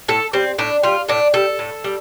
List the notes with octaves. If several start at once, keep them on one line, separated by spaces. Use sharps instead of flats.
A2 A4
G3 C4
A2 D4
G3 F4
A2 D4
G3 A4
A2
G3